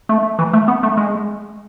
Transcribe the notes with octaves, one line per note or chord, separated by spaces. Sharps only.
A3
E3
A3
B3
A3
G#3